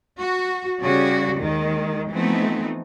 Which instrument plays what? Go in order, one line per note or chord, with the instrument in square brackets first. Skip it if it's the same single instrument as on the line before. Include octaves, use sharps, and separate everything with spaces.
[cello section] F#4
C#3 G3 F#4 G4 D5
D#2 D#3 G#3
E3 F3 A3 B3 C4 D#4